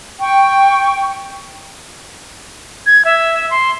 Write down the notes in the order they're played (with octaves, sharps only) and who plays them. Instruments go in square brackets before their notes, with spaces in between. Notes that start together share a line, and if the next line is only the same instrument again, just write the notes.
[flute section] G5 C#6
[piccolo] G#6
E5
C6